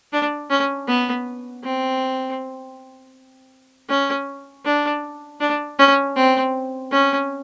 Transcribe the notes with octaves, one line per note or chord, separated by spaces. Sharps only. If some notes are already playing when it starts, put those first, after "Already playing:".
D4
C#4
B3
C4
C#4
D4
D4
C#4
C4
C#4